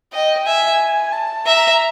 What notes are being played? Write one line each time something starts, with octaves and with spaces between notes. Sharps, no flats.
D#5 G5
E5 G#5
A5
E5 A#5